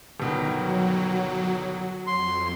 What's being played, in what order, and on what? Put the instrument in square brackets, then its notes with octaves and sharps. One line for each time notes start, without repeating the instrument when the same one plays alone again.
[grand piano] G1 B2 D#3 [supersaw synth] F#3
[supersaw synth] F2 [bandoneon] C6